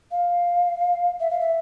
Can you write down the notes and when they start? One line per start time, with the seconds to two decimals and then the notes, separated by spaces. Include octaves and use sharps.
0.11 F5
1.20 E5
1.31 F5
1.41 E5